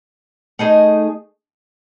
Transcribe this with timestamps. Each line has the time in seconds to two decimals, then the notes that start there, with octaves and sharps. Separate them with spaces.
0.59 A3 D#4 G#4 D#5